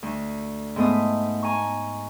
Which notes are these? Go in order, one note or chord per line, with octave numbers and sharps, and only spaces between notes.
D2
G#2 A3 B3 D#6
G#5 A#5 C#6